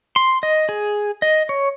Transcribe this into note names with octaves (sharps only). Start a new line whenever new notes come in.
C6
D#5
G#4
D#5
C#5